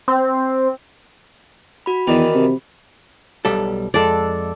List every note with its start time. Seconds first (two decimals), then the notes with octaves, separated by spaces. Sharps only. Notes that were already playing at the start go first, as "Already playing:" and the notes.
0.08 C4
1.86 F#4 B5
2.07 E2 D#3 E3 D4
2.35 C3
3.45 B1 G3 A4
3.94 F2 G#3 A4 D5